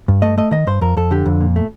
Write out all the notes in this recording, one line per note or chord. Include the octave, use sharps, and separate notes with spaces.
G2
A3 D#5
A3 D#5
D#3 D#5
G2 C5
F2 A#4
F2 A4
D3 G4
F2
A#2
A3